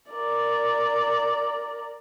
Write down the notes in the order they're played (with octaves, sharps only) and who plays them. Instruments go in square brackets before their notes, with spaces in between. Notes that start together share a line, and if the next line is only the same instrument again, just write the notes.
[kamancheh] A#4 D5